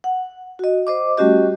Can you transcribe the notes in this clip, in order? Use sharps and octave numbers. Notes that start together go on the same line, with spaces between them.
F#5
F#4 D#5
C5 D#5 D6
G3 A3 C#4 F#4 G4 D#5